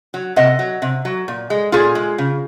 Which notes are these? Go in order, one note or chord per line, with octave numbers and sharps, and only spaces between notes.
F#3
C3 D#5 F#5
F#3
C3
F#3
A#2
G#3
A#2 F4 G#4
G#3
C#3